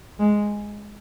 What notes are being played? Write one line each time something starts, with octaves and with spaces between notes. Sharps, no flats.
G#3